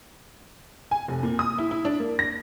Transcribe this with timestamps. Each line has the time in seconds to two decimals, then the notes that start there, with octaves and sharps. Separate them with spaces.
0.91 G#5
1.08 F1
1.23 A#2
1.39 D#6
1.58 E4
1.71 E4
1.85 D4
2.00 A#3
2.19 A#6